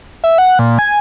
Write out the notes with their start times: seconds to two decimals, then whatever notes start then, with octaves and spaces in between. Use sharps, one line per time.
0.24 E5
0.38 F#5
0.59 A#2
0.79 G#5